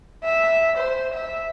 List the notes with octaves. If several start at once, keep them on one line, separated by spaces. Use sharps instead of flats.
E5
C5
E5